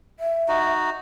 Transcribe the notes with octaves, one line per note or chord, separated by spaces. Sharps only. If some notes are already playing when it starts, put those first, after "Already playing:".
E5
D#4 F#4